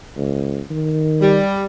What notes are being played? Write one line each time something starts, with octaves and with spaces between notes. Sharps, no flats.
C#2
D#3
G3